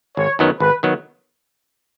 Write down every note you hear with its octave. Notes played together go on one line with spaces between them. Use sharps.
G#1 C#5
F#2 D#3 F#3 B3
G#1 B4
D#3 F#3 B3